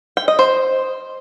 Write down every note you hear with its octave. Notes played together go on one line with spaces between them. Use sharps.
G5
D#5
C5